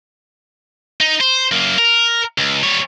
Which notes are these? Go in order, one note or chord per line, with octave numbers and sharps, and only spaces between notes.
D#4
C5
F#2 A#3
A#4
C#2
G3 C#5